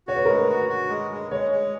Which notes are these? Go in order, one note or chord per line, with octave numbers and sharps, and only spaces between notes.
F#4 C#5
B4
G#3 A#4
B4
F#4
F#4
G#3
G#3
G#3 C#5
G#3